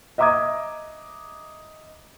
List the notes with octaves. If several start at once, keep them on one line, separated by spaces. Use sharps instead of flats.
D#5 E5 A#5 D6 D#6 G#6